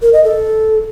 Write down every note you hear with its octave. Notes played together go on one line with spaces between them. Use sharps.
A#4
D#5
A4